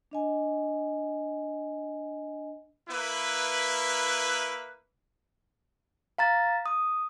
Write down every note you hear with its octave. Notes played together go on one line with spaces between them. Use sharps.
D4 D#5 G#5
A#3 E4 B4
F5 A#5 A6
D#6